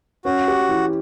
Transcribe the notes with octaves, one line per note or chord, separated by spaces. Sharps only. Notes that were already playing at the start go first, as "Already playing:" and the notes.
C#4 F#4
G4
E3